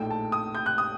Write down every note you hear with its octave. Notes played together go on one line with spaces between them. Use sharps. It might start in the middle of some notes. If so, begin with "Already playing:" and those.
Already playing: A#1 A2 A3 D#4 G5
A5
D#6
G6
F#6
D#6